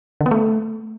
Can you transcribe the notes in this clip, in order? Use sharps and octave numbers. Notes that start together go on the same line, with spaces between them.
D3
B3
A3